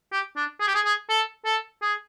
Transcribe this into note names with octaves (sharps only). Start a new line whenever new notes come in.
G4
D4
G#4
G4
G#4
G#4
A4
A4
G#4